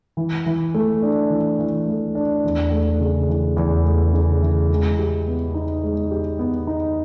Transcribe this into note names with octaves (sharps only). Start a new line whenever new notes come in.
E3
E3
A3
D4
E3
E3
A3
D4
E2
A3
C#3
E3
E2
A3
C#3
E3
G#3
G4
B3
D#4
G#3
G4
B3
D#4